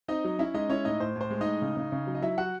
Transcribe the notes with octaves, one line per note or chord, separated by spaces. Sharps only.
C4 D#4 D#5
F#3
C#4 E4 E5
G#3 D#4 D#5
C#4 E4 C#5
A2 D#4 D#5
A2 C5
A2 C5
G#3
D#4 D#5
A2
C#3
C#3
C#3
F#3
D#5
F#3 E4 E5
F#3 F#4 F#5